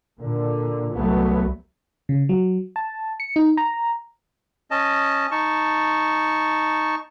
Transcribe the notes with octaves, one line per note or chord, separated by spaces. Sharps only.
A#2 D3
C2 F#3 A3 B3
C#3
F#3
A5
C#7
D#4
A#5
C#4 D#5 A5
D#4 A5 C#6